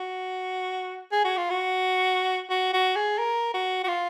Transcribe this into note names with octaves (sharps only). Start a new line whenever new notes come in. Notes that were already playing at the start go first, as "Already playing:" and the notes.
Already playing: F#4
G#4
F#4
F4
F#4
F#4
F#4
G#4
A#4
F#4
F#4
F4